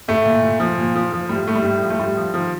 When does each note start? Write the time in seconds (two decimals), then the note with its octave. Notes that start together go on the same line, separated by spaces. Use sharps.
0.08 A2 A3
0.26 A#2
0.43 A#2
0.60 F3
0.77 A#2
0.96 F3
1.12 F3
1.29 A2 G3
1.47 A2 A3
1.56 G3
1.64 A2
1.82 F3
1.90 A3
1.99 A2 G3
2.17 F3
2.34 D#3 F3